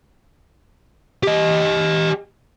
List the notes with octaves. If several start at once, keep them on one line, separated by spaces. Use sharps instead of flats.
G4 D#5